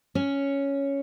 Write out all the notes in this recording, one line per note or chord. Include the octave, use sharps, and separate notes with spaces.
C#4 C#5